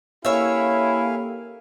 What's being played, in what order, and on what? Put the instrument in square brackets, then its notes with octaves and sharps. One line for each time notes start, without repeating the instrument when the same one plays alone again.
[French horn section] A#3 G4 A4 [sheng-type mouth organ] C#4 F5 [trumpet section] E4 [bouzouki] C#5 E5